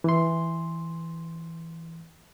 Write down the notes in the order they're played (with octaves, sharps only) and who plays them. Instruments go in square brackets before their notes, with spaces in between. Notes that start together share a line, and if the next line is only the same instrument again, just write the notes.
[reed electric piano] E3 C6